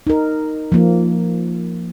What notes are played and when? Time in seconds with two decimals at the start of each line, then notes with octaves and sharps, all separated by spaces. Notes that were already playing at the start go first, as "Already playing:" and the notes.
0.07 D#4 A#4
0.72 F3 A#3